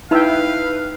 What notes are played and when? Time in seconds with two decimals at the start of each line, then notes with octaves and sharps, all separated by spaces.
0.11 D#4 E4 B4 E5 F5 G5 B5 E6